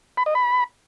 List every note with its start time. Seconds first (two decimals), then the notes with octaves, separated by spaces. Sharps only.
0.17 B5
0.26 D#5
0.35 B5